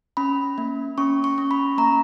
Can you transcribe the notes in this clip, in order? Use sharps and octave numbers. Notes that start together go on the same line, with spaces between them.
C#4 B5
A#3
C#4 C#6
C#6
C#4
B5
A#3 A#5